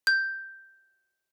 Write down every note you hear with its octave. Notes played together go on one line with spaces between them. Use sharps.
G6